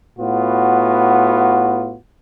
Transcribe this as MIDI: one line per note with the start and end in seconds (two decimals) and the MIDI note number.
0.19 1.97 45
0.19 1.97 59
0.19 1.97 65
0.19 1.97 66